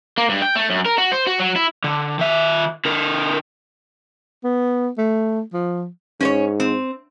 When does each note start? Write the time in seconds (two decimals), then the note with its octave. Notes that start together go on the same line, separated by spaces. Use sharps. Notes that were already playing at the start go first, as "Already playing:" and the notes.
0.18 A#3
0.29 G2
0.42 G5
0.56 A3
0.70 F#2
0.85 A#4
0.98 F#4
1.12 C5
1.27 F#4
1.40 F#3
1.56 E4
1.84 D3
2.19 D#3 E5
2.85 D3 A#4
4.44 B3
4.98 A3
5.53 F3
6.21 G#2 C#4 C5 C#5
6.60 C4